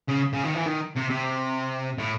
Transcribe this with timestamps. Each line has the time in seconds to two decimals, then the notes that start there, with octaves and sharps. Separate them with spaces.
0.09 C#3
0.34 C#3
0.44 D#3
0.55 E3
0.66 D#3
0.96 C3
1.10 C3
1.98 A2